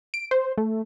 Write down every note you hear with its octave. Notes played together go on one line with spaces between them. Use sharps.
D7
C5
A3